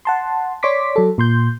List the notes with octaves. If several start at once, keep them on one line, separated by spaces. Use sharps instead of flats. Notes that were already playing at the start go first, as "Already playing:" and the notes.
F#5 A5 C6
C#5 D5 C6 D6 B6
F#3 A4
A#2 C6 G6